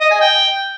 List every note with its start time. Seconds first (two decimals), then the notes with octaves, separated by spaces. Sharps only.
0.01 D#5
0.11 G#5
0.21 G5